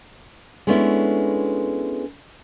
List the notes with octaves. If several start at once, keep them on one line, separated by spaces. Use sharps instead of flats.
G#3 A3 B3 C#4 D4 E4